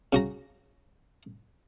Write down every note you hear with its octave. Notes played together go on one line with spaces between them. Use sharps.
C#3 F#4 A#5